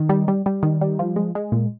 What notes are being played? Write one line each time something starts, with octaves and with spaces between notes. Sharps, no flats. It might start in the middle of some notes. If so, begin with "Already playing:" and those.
Already playing: D#3
G3
G3
G3
D#3
G3
F3
G#3
G#3
A#2